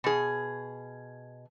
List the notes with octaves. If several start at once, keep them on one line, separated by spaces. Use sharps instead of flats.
B2 G#4